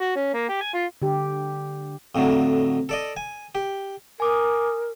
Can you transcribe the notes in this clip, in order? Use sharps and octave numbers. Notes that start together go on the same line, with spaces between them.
F#4
C#4
A#3
G4
G#5
F4
D3 G4
F2 A2 D3 F#3
A4 D5 D#5
G#5
G4
A#4 G#5 D6 D#6